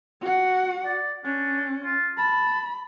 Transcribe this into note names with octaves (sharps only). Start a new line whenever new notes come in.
F#4 F#5
D5
C#4 D4
F4
A5 B5